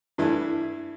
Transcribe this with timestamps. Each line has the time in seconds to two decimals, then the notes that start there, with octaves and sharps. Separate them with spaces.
0.18 G2 E3 A3 E4